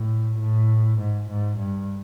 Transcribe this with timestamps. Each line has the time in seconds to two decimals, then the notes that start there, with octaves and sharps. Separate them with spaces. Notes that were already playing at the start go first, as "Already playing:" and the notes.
Already playing: A2
0.40 A2
0.99 G#2
1.29 G#2
1.59 G2